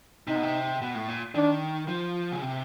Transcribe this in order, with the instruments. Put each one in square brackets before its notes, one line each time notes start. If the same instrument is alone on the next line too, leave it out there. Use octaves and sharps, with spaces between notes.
[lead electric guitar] C3 [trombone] D#4
[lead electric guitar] B2
C3
B2
A2
A#2
[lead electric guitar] D#3 [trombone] D4
[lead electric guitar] F3
C#3
C3